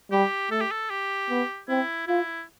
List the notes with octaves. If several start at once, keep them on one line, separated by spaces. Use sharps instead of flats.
G3 G4
A3 A4
G4
A4
G4
B3
C4 E4
E4 F4